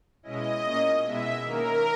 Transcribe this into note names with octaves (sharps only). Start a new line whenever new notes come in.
B2 G#3 C#4 E4 D#5
A#2 A#3 C#4
B2 G#3 B3 E4 E5
D#3 A#3 C#4 A#4